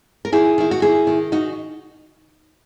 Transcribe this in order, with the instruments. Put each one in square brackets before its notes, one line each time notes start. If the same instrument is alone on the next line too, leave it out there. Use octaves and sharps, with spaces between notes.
[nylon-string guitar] A#4
D#3 E4 G#4
D#3 E4
F#4
D#3 E4 G#4
D#3
D#3 D#4 F#4